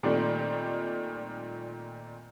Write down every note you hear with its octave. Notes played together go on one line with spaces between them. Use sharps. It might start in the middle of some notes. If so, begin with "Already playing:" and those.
A#2 D#3 G3 A3 C4